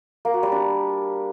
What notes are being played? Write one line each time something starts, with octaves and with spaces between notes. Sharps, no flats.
A#3
F#4
G3
D4